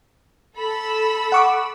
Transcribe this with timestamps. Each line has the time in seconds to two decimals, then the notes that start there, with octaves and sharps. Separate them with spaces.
0.56 A4 B5 E6
1.32 F#5 C#6 D6